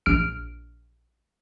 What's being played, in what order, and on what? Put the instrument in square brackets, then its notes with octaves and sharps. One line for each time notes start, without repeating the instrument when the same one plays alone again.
[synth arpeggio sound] A#1 F6 D7